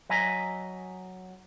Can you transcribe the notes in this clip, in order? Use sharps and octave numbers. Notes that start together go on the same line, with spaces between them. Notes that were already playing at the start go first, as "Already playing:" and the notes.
F#3 D#5 E5 G#5 A#5